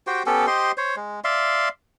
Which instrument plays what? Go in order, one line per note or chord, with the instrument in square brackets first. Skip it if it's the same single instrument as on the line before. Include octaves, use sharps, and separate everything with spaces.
[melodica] F#4 G4 C5 G5
B3 C#4 G4 A4
G4 C5 D#5 C6
C5 C#5
G#3
D5 E5 F5 C6